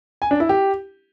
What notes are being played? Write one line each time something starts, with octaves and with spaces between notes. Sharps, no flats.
G#5
D4
E4
G4